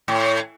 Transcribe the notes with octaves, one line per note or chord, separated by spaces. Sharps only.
A2